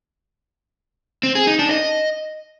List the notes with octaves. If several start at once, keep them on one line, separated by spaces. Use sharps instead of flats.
C4
G#4
D#4
D4
D#5